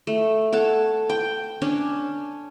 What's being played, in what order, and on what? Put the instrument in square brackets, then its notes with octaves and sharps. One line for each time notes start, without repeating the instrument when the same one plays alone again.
[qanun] A3
A4 C#5 F#5 A5
G5
C#4 D4 C#5